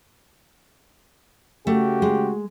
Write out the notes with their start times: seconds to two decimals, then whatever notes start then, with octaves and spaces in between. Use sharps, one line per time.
1.67 C#3 A3 F#4 G4
2.02 G#3